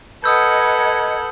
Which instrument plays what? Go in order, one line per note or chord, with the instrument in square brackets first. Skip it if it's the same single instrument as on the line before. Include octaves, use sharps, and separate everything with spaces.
[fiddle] A4 F#5 [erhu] B4 [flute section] D#5 G#6 [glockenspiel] D#6 E6 G6